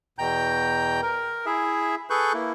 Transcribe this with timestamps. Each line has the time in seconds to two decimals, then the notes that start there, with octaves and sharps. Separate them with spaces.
0.18 E2 B2 G5 A#5 G6
1.03 A#4
1.46 E4 G#4 E5
2.10 G#4 A4 B4 C#6 F#6 G6
2.34 A#3 E4